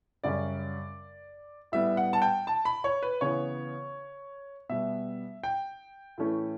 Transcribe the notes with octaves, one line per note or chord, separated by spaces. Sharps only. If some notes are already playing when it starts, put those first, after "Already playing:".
F#2 C#3 G3 C#4 D5
A2 G3 B3 E5
F#5
A5
G5
A5
B5
C#5
B4
C#3 E3 B3 C#5
B2 G3 B3 E5
G5
A2 E3 A3 C#4